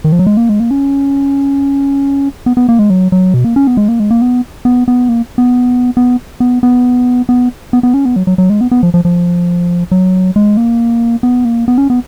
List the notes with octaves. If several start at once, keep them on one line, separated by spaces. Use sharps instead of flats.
D#3
F3
F#3
G#3
A#3
G#3
A#3
C#4
B3
B3
A#3
G#3
F#3
F#3
B2
A#3
C#4
B3
G#3
A#3
G#3
A#3
B3
B3
B3
A#3
B3
B3
B3
B3
B3
B3
B3
C#4
B3
F#3
F#3
F#3
G#3
B3
B3
F3
F3
F3
F#3
G#3
A#3
B3
A#3
B3
C#4
B3